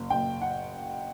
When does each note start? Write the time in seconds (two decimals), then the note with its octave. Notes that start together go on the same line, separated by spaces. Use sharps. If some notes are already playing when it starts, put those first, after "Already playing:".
Already playing: F#1
0.10 F#1 G5
0.42 F#5